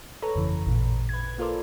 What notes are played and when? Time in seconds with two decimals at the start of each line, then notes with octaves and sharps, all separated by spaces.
0.22 A4 B4 C#5 A#5
0.34 G1 F2 C#3 E3
0.66 A1 A#2
1.09 B4 G#6
1.38 A#3 F4 A4 A#4 C5 D5